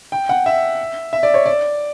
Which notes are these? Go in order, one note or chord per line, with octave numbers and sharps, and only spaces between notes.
G5
F#5
E5
E5
D5
C#5
D5